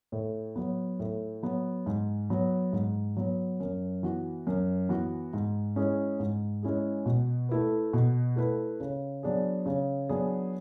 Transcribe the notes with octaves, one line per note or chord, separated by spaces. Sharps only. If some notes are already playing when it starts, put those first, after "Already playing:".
A2
F#3 B3
A2
F#3 B3
G#2
F#3 B3
G#2
F#3 B3
F#2
E3 B3 F#4
F#2
E3 B3 F#4
G#2
G#3 C#4 E4 G#4
G#2
G#3 C#4 E4 G#4
B2
A3 E4 B4
B2
A3 E4 B4
C#3
F#3 B3 D4 G#4
C#3
F#3 B3 D4 G#4